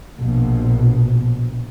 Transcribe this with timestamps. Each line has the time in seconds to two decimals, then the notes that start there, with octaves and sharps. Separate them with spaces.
0.18 A#1 B2